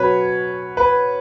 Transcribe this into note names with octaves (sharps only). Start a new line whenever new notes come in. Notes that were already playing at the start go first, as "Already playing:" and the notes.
Already playing: B2 F#3 C#4 B4 C#5
B4